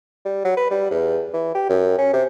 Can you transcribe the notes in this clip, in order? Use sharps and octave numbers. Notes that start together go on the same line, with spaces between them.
G3
F#3
B4
G3
E2
E3
G4
F#2
C#4
C3